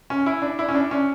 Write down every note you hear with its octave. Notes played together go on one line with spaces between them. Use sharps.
C#4
E4
D4
E4
C#4
D4
C#4